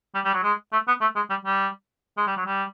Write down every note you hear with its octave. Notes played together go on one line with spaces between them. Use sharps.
G3
G3
F#3
G#3
A3
B3
A3
G#3
G3
G3
G#3
G3
F#3
G3